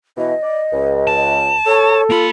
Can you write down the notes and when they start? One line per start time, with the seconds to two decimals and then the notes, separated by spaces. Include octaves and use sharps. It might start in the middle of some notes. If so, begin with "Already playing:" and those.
0.18 B2 E3 D#5
0.43 D5
0.73 C#2
1.07 A5
1.66 A4 C#5
2.10 A#3 F4 B5